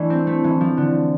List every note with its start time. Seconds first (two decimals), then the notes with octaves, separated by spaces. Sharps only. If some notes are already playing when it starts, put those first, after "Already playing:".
Already playing: E3 A3 D4
0.10 C4
0.27 A3
0.44 E3
0.61 F3
0.77 D3